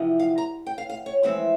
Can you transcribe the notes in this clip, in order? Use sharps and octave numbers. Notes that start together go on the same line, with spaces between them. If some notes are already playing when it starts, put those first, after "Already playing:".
Already playing: E2 C3 F3
F5
A#5
G5
F5
F5
C#5
F2 E3 G#3 C4 E5